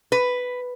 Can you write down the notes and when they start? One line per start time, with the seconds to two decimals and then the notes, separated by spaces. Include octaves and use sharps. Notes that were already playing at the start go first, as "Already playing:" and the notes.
0.12 B4